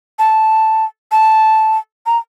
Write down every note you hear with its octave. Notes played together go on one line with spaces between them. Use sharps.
A5
A5
A#5